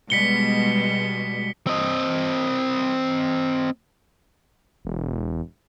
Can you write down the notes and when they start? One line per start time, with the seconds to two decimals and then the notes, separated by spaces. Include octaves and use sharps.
0.10 B2 G3 G#3 B6 C#7 G7
1.67 C4 D#5
4.85 E1